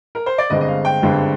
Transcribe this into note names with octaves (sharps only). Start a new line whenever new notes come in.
A#4
C5
D5
G1 G2 D3 G#3 C4 D#5
D#5
F5
G5
G1 G2 D3 G#3 C4